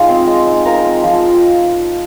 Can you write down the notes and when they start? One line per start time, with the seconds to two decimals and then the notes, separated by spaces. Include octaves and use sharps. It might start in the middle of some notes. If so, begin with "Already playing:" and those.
Already playing: G#3 D#4 F4 D#5 F5
0.08 C4
0.27 G#3
0.46 D#4
0.65 F4 A#4 A#5
0.84 C4
1.03 F3